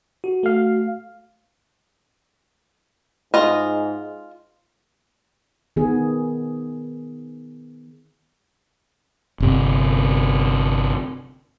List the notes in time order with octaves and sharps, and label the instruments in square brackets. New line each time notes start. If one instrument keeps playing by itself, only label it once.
[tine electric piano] F#4
[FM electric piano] A3 F5
[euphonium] G#2 [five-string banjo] F4 D#5
[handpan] D#3 B3 G#4
[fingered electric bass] G1 C3